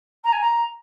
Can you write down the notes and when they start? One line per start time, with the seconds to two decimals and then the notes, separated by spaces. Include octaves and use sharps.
0.24 A#5
0.32 G#5
0.40 A#5